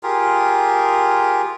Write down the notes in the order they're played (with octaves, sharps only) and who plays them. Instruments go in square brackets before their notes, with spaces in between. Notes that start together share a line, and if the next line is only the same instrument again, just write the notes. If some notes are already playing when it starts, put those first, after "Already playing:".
[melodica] F4 G4 G#4 A#4